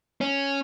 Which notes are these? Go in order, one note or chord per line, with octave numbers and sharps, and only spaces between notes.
C#4